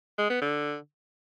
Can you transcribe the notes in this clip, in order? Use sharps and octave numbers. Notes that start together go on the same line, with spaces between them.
G#3
B3
D3